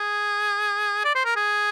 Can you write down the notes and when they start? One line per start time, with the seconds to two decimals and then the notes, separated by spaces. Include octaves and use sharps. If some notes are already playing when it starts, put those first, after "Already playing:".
Already playing: G#4
1.05 D5
1.15 C5
1.25 A#4
1.36 G#4